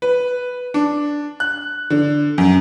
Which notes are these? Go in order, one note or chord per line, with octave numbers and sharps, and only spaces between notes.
B4
D4
F#6
D3
F#2